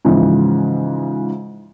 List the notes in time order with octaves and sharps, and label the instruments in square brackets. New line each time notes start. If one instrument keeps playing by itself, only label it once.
[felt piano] G#2 C#3 E3 F3